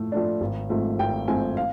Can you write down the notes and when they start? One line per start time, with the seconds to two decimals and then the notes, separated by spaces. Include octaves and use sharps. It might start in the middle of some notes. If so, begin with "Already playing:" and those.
Already playing: A2 F3 A3
0.12 F3 A3 D4
0.41 G#1
0.70 G#2 F3 A3 C4
0.99 G#1 G5
1.28 G#2 F3 A3 C4 G#5
1.57 F5